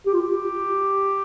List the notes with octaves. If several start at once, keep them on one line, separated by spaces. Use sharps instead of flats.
G4
F4
G4